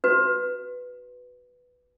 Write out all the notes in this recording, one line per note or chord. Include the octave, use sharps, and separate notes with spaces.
F#4 B4